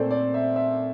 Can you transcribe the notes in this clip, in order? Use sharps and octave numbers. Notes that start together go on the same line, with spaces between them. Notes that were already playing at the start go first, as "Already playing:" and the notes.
Already playing: A#2 A3 C4 A4 C5 D5
D5
E5
E5